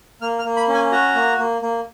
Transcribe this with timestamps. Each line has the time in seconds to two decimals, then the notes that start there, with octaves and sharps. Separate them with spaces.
0.22 A#3 F6
0.39 F6
0.45 A#3
0.57 B5
0.68 C#4
0.74 G#5
0.92 F#4 A#5
1.15 A#3
1.38 A#3
1.62 A#3